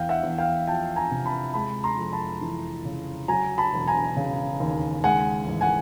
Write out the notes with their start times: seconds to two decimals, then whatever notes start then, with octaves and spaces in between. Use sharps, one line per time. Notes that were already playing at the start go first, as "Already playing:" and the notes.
Already playing: E2 F5 G5
0.09 E5 F#5
0.23 E2
0.38 F5 G5
0.67 F3 G5 A5
0.96 G#5 A#5
1.11 C3
1.26 A5 B5
1.54 G#3 A5 B5
1.84 A#5 C6
1.98 F2
2.13 A5 B5
2.41 E3
2.85 C#3
3.28 F#3 G#5 A#5
3.58 A5 B5
3.73 E1
3.88 G#5 A#5
4.17 C#3
4.60 D#2
5.04 G#3 F#5 G#5
5.46 A1
5.61 F#5 G#5